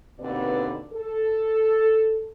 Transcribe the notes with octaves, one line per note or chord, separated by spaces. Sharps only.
D#2 B2 D3 C4 B4 D5
A4